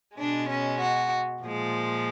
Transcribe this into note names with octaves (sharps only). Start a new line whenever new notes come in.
B2 G#3 D4
C#4
F#4
A#2 F3 G#3